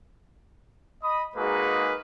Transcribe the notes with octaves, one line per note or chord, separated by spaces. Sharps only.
D#5 B5 D#6
G#3 A#3 D#4 F#4 G#4 B4